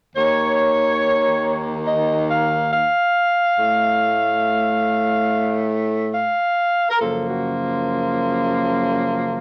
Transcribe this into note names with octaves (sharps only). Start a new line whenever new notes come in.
D#2 D#3 A#3 C#5
D#5
F5
F5
A2 A3
F5
A#4
F#2 C#3 F3 A#3 A4
F#4